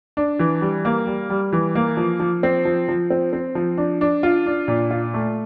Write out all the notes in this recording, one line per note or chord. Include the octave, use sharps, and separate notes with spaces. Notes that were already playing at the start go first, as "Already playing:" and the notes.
D4
E3
G3
A#3
G3
G3
E3
A#3
F3
F3
C4
F3
F3
C4
C4
F3
D4
D4
F4
D4
A#2
F4
A3